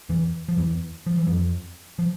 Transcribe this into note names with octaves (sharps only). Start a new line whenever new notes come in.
E2 E3
F3
E2 E3
F3
E3
F2 F3
F3